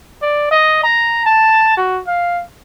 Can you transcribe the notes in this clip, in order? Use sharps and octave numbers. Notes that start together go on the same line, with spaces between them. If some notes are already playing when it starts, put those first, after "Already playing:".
D5
D#5
A#5
A5
F#4
F5